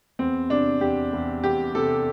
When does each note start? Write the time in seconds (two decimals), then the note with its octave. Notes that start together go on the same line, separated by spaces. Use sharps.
0.19 E2 C4
0.50 C3 D4
0.81 E2 G4
1.13 E2
1.43 E2 G4
1.75 C3 A4